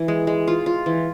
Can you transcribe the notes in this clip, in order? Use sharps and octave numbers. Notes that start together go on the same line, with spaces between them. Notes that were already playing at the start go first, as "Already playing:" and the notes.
Already playing: E3
G#3
G#3
F4
F4
E3